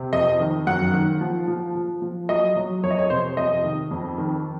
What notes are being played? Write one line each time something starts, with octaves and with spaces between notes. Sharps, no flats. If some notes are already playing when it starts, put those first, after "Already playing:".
Already playing: C3
F2 D#5
D#3
F#2 F#5
D#3
F3
F3
F3
F3
F#3 D#5
F#3
F2 C#5
D#5
C#5
C3 C5
F2 D#5
D#3
F2
D#3